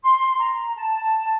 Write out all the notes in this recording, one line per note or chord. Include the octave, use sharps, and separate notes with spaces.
C6
A#5
A5